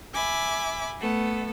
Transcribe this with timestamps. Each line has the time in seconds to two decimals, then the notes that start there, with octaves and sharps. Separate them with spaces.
0.14 E5 G#5 B5 D6
1.00 A3 B3 A4